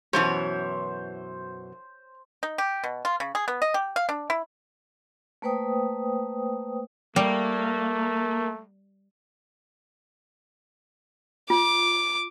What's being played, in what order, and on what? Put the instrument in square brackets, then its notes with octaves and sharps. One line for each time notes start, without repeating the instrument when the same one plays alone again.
[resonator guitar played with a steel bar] F#2 B2 E3 [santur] C5 [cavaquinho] C#5
[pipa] D#4
G4
B2
F4
C#3
G#4
B3
D#5
G4
F5
D4
E4
[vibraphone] A3 A#3 B4 C5 G5 D#6
[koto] G3 [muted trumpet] A3 [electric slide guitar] A#3
[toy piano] F4 [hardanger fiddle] D6